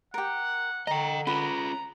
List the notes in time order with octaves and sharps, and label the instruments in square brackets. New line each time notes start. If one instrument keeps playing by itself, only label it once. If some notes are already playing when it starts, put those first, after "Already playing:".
[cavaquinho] G4 A#4 [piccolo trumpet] F#5
[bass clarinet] D3 [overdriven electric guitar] D#5 G5 [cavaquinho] A#5
[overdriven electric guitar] C#4 F4 [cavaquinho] B4 B5 [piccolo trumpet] A#5